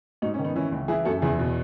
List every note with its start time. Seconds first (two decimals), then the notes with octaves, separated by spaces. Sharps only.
0.22 G#2 D#4 F#4
0.34 C#4
0.39 D#3
0.45 B3 D#4
0.55 E3 C#4 E4
0.72 C#2
0.88 E3 E4 G#4
1.05 F#2 F#4 A4
1.22 E2 E4 G#4
1.39 B2